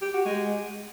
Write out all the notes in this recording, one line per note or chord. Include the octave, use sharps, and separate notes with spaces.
G4
F#4
G#3